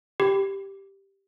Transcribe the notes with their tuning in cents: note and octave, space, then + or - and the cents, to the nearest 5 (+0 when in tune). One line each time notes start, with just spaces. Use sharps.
G4 +0 B5 +25